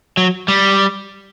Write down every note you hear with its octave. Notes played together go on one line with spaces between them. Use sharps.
F#3
G3